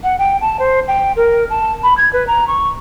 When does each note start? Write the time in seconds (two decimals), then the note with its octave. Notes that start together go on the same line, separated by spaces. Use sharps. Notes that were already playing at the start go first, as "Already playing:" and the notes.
0.04 F#5
0.19 G5
0.41 A5
0.59 C5
0.88 G5
1.16 A#4
1.50 A5
1.83 B5
1.97 G#6
2.13 B4
2.27 A#5
2.47 C#6